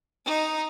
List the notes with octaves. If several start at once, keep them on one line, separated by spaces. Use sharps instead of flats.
D#4